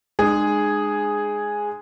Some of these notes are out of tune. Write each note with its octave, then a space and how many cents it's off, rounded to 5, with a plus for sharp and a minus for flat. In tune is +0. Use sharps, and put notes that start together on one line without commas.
G#3 +0 D#4 -45 G#4 +0